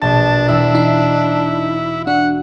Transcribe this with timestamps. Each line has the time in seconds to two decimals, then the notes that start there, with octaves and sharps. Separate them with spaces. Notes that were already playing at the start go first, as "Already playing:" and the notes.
0.02 A#1 B2 D4 A5
0.48 E1 E4 E6
0.75 D#4 E5 C7
2.07 D4 F#4 F#5